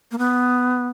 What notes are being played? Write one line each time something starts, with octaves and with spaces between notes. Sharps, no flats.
A#3
B3